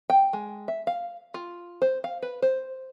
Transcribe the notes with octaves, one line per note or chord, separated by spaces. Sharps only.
G5
G#3
E5
F5
F4
C5
F5
B4
C5